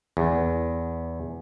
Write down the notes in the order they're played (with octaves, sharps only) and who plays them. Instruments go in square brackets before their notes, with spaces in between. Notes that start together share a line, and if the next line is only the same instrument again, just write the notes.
[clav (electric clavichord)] E2